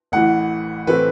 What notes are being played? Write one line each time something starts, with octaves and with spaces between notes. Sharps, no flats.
A1 A2 E3 F#5
A2 E3 A3 C4 B4